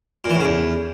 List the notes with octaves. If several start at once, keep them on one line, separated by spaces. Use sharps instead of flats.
A#2
E3
A2
C#3
E2